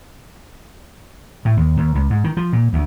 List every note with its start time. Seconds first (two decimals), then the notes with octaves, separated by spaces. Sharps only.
1.45 A2
1.57 D#2
1.77 D#2
1.95 C#2
2.10 G#2
2.24 D#3
2.37 F3
2.53 A#2
2.73 D2